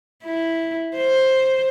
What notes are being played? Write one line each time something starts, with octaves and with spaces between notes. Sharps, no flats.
E4
C5